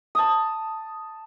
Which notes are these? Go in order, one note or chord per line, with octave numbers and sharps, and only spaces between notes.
A5 D#6